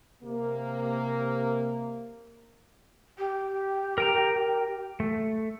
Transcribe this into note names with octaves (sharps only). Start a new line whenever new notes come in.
C3 A#3
G4
A#4 G5 A#5
A3